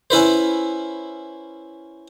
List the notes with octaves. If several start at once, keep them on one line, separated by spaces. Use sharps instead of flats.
C#4 E4 B4 C5